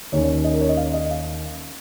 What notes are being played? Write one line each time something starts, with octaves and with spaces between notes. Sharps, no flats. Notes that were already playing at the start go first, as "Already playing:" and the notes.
D#2 D#3 C#4 C#5
C#5
D#5
A#4
C#5
D#5
F5
D#5
F5